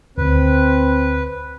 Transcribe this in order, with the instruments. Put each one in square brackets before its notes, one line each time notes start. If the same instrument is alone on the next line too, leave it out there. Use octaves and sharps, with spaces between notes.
[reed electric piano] D2 [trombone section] C4 [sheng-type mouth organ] B4